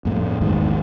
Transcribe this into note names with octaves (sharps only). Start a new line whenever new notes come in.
F2 A2
A#1 E2 G#2 D#3